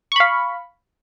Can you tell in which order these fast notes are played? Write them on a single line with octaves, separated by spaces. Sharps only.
C#6 B5 F5